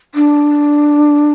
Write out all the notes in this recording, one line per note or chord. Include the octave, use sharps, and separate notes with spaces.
D4